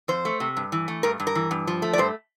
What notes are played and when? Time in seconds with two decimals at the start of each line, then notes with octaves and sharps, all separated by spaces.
0.08 F2 C5
0.25 A3
0.40 C3
0.57 G2
0.72 E3
0.88 A3
1.03 G2 A#4
1.20 G2
1.27 A#4
1.35 E3
1.51 G2
1.67 F3
1.82 A3
1.93 D5
1.98 G2 C5